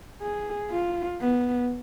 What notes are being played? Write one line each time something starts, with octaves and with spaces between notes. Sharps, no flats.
G#4
F4
B3